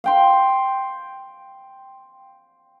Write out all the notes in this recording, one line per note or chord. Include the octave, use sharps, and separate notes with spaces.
F5 G5 C6